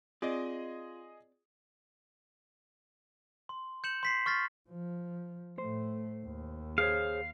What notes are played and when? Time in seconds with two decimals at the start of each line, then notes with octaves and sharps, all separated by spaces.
0.22 C4 F4 G#4 D5 D#5
3.49 C6
3.84 G6 C#7 E7 F#7
4.03 C6 B6 C7
4.26 C#6 F6 A6 B6
4.69 F3
5.58 A2 A3 C5
6.25 D#2
6.78 G#4 C5 C#5 F5